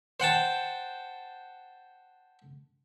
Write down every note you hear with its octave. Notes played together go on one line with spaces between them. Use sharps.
C5 F#5 G5 A5